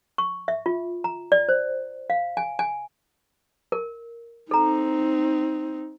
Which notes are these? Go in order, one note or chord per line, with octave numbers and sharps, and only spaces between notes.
C#6
E5
F4
A#5
D5
C5
F5
G#5
G#5
A#4
C4 D#4 A4 A#5